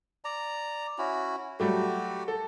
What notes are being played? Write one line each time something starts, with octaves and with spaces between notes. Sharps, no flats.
D5 A#5
C#4 E4 F#4
F#3 G3 A3 F#4 G4
A4